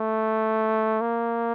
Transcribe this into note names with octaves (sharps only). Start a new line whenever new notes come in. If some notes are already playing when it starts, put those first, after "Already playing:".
Already playing: A3
A#3